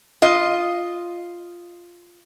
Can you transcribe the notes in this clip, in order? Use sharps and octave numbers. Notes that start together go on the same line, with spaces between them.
F4 D#5